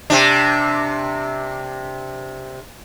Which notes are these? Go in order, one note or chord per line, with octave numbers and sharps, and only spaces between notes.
C3 D4